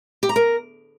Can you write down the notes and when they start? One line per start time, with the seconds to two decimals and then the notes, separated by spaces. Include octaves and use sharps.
0.23 G4
0.29 A#5
0.36 A#4